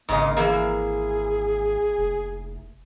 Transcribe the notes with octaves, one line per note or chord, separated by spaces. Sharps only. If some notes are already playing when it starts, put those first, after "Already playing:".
G#1 G#2 C#3 A#3 D#5
E3 A#3 G#4
F1